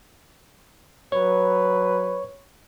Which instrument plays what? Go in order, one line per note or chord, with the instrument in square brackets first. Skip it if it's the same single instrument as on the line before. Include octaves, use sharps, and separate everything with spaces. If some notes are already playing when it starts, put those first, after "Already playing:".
[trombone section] F#3 B4 [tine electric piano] C#5 C#6